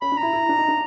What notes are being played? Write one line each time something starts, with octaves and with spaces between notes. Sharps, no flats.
C#4 B5
D4
A#5
E4
E4
D4
D#4
D4